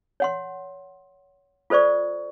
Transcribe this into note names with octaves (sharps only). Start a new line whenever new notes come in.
C#5 F#5 C6
F4 A4 C5 D5 C#6